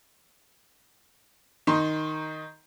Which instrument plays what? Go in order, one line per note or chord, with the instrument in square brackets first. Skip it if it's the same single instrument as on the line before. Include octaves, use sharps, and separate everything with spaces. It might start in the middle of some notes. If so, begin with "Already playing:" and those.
[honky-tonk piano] D#3 D#4 C6